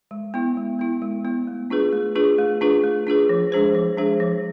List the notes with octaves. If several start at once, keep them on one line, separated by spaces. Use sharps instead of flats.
G#3
B3 E4
G#3
B3 E4
G#3
B3 E4
A3
D4 F4 G#4 B4
A3
D4 F4 G#4 B4
A3
D4 F4 G#4 B4
A3
D4 F4 G#4 B4
F3
G#3 D4 G#4 C5
F3
G#3 D4 G#4 C5
F3